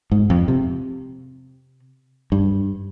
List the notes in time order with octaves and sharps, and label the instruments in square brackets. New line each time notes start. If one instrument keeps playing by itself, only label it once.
[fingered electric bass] G#2
F2
C3
G2